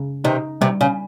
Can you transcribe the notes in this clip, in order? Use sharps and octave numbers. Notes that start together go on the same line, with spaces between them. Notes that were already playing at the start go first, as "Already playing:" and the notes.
Already playing: C#3
C3 D#3 D#4
C3 D#3 G3
C#3